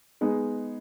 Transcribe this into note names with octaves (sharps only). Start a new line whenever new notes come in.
G#3 B3 D#4 G#4